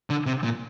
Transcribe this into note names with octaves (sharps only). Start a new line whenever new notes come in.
D3
C3
A#2